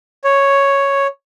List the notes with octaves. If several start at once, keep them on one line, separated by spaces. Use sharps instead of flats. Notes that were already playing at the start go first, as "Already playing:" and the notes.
C#5